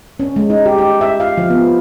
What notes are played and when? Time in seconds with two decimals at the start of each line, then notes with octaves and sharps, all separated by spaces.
0.20 C#4
0.36 G#3
0.50 D#4
0.66 G4
0.78 G4
1.01 E5
1.20 F5
1.38 F3
1.50 B3